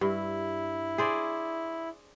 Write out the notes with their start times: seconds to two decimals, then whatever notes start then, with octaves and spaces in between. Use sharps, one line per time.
0.01 G2 E4
0.98 G#4 C5 D5